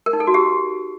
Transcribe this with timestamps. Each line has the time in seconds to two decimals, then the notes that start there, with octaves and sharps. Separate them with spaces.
0.06 A#4
0.13 D#4
0.20 A4
0.27 F#4
0.34 G4